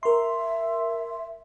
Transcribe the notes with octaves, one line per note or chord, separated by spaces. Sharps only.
A#4 E5 C6